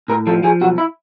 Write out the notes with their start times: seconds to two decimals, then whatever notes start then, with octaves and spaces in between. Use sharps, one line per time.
0.08 A2 A#4
0.27 F3 A4
0.43 F3 G#4
0.61 B1 F#4
0.78 E4